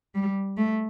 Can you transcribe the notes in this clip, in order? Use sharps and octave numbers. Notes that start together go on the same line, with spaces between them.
G3
A3